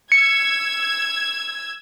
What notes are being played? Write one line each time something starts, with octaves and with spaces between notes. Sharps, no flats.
E6 G#6 C#7